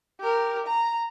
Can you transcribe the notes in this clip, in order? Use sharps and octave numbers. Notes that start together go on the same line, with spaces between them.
G4 A#4
A#5